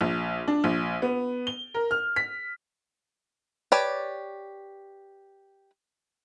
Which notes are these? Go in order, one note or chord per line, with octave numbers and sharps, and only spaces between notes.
A#1
D4
A#1
B3
G7
A#4
F6
B6
G4 B4 C#5 D5 A5